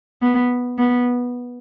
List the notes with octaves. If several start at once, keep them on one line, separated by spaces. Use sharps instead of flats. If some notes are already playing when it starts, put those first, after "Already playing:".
B3
B3